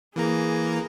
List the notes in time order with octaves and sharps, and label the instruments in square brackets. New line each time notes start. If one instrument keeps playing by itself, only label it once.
[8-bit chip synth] E3 A#3 A#5 [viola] G#4